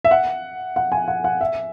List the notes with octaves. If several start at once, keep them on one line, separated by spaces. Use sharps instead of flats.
E5
F#5
F#5
G#5
F#5
F#5
E5